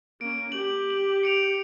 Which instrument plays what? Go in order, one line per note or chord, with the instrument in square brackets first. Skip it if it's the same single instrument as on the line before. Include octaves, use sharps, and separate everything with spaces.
[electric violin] A#3 C#4 [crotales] D7
[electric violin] G4 [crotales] F#7
[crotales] F#7
C#7 D7 F7